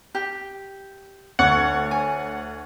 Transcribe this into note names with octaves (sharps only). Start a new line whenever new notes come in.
G4
D2 C#5 F#5
G#5